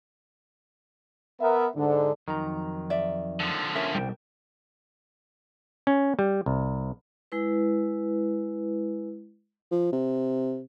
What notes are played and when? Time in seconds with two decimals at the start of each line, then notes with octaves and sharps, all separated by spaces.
1.41 B3 A#4 E5
1.76 G#2 D3
2.28 F2 D#3 F#3 A#5
2.90 D5 E5
3.40 D3 F3
3.76 C#4 A#4 E5
3.95 C2 B2 G3 G5
5.87 C#4
6.19 G3
6.46 C2
7.32 G#3 E4 B4
9.72 F3
9.93 C3